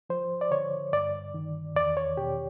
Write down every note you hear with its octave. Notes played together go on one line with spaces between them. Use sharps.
F3 C5
D5
D3 C#5
G2 D5
D#3
E2 D5
C#5
B2 G4